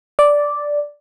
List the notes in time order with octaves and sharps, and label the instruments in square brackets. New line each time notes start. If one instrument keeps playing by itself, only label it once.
[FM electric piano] D5